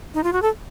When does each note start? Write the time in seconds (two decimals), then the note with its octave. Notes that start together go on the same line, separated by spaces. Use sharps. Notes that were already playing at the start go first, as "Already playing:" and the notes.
0.14 D#4
0.24 F4
0.33 F#4
0.42 A4